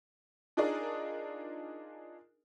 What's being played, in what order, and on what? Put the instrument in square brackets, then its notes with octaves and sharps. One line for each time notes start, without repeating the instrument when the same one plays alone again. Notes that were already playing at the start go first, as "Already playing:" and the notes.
[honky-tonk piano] D4 D#4 F4 G#4 A#4 D5